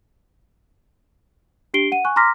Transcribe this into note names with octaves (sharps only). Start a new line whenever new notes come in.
D4 G4 C7 D7 G7
F#5 D#7
G#5 C#6 F#6
A#5 C6 D6 F6 A#6 B6